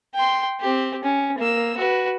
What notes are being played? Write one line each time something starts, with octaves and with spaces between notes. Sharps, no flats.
G5 C6
C4 G4
C#4
A#3 E6
F#4 B4